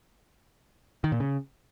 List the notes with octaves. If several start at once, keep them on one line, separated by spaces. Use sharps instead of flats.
D#3
A#2
C#3